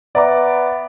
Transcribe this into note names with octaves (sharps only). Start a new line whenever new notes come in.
B3 B4 D5 E5 A#5 D6